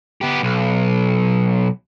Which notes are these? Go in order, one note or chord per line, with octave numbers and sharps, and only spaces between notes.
B3 G4
B1